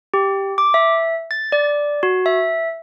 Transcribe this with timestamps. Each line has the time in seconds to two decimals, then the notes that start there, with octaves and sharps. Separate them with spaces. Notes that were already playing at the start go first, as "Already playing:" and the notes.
0.14 G4
0.58 D6
0.74 E5
1.31 A6
1.52 D5
2.03 F#4
2.26 E5